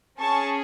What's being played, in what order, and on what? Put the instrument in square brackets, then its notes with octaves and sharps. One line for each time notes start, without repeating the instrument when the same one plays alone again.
[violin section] C#4 G#4 A5 C#6